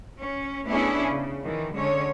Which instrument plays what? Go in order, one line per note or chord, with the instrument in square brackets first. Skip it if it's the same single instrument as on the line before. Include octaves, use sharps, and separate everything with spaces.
[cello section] C#4
A3 B3 C#4 D4 E4 G#4
C#3
D#3 E3
D3 G#3 C#4 C#5